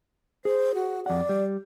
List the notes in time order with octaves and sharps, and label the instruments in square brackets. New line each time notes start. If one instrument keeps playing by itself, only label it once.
[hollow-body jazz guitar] G#4 [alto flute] C5
[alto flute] F#4
[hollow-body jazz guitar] F2 F#5 [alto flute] D5
[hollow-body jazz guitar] G3